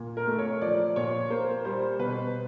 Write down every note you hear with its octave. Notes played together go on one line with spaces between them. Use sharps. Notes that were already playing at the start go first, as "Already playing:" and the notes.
Already playing: A#2
A#4
A3
C#5
F3 D5
A#2 C#5
A#3 C5
G3 C5
B2 B4